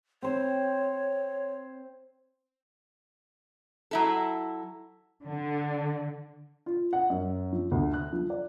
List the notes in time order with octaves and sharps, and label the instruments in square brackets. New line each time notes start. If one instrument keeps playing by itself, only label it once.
[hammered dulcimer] C4 C5 [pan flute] C#5
[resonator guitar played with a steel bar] F#3 E4 A4
[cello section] D3
[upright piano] F4
F#5
F#2
F3
D2
F#6
F3
D5